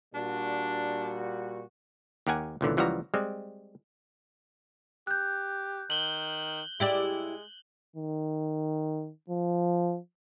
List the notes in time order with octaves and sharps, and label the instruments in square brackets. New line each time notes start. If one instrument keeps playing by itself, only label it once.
[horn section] A#2 G3 F#4 [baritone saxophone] D4
[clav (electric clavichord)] D#2 G4 A#4 F#5 G#5
C#2 A#2 D3 E3
C#2 E3 F3 G3 F#4 A#5
G3 G#3 C4
[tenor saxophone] G4 [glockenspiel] F#6 G6
[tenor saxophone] D#3 [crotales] F#7 G7
[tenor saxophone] G#3 [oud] E4 G4 D5
[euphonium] D#3
F3